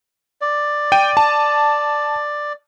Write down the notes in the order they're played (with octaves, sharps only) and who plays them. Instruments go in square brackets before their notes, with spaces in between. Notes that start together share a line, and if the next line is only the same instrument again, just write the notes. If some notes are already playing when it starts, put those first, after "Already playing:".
[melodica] D5
[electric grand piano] G5 D#7
A5